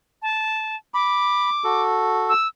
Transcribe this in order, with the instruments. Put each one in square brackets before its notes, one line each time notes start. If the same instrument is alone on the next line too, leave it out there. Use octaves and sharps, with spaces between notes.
[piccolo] A5
[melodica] B5 [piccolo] D6
[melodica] F#4 A4
[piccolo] E6